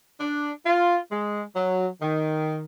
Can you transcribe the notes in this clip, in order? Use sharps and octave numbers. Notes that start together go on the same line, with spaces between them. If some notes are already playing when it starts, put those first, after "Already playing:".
D4
F4
G#3
F#3
D#3